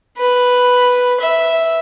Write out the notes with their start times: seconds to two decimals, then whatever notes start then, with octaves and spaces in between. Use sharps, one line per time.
0.17 B4
1.20 E5